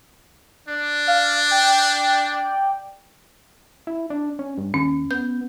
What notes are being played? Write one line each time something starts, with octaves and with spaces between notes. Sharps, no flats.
D4 D5
F5
G5
E4
D4
C#4
G2
D#2 C#4
B3 G6